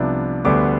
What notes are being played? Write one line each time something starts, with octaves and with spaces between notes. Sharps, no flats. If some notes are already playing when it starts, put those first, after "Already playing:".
Already playing: C2 C3 F3 B3 D4
D2 D3 G3 B3 D6